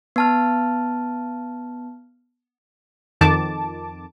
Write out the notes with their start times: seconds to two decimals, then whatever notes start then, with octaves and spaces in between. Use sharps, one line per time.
0.16 B3 A5 F6
3.21 F2 D#3 A5 D6